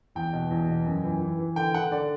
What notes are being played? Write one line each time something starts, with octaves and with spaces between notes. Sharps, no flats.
E2 G5
B2
E2
B2
F#2
E3
E3
E3
D3 G5
D3 F#5
D3 D5